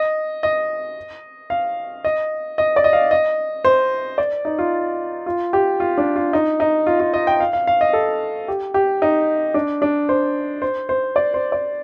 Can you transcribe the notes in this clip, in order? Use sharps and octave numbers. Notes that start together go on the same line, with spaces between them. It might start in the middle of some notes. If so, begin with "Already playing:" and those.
Already playing: D#5
D#5
F5
D#5
D#5
D5
D#5
F5
D#5
C5
D5
D#4
F4
F4
G4
F4
D4
F4
D#4
D#4
F4
F4
D#5
G5
F5
F5
F5
D#5
A4
G4
G4
D#4
D4
D4
C5
C5
C5
D5
C5
D5